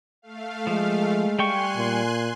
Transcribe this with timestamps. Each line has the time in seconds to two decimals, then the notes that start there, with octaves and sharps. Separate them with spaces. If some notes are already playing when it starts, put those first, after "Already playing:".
0.22 A3 F5
0.67 F3 G#3
1.39 G3 G5 G#5 C6 C#6 F#6
1.76 A#2